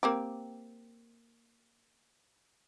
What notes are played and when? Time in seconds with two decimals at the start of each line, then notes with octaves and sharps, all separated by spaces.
0.03 A#3 C4 G4